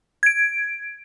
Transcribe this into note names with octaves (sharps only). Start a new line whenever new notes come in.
G#6 D7